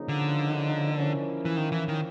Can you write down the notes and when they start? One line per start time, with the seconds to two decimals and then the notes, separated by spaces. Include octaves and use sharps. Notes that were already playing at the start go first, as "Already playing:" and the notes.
Already playing: C#3 F3 A#3 D#4
0.08 D3
0.93 F3 A#3 C#4 E4
1.45 E3
1.57 D#3
1.72 E3
1.88 D#3